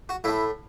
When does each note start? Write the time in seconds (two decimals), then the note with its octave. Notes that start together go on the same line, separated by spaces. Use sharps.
0.09 F#4
0.24 A2 A3 E4